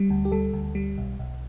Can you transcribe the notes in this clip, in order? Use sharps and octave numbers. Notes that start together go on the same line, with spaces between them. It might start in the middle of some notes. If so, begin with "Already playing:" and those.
Already playing: G3
D2
G4
G3 A4
D2
G3
B1
B1